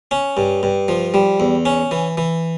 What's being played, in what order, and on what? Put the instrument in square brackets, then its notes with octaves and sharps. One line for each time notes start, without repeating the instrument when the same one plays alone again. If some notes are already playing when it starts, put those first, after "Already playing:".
[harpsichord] C#4
G2
G2
F3
G3
E2
C#4
E3
E3